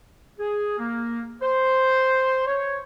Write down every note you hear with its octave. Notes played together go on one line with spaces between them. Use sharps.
G#4
A#3
C5
C#5